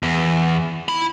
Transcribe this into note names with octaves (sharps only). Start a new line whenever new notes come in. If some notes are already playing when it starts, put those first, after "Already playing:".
E2
E4 B5